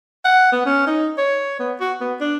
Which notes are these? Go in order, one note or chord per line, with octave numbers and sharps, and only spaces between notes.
F#5
B3
C#4
D#4
C#5
B3
F#4
B3
D4